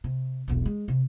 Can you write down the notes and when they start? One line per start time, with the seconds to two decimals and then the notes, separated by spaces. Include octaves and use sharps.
0.04 C3
0.48 E1 B1
0.65 G#3
0.88 C3